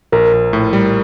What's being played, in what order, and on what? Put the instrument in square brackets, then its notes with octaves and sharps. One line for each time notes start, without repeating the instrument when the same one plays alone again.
[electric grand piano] A#1 [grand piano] A#4
[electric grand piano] A#1
A2
G3